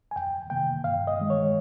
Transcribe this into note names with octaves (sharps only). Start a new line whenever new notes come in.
G#5
F2 G5
C3 D#3 A#3 G5
G2 F5
D#5
D#3 G#3
C#5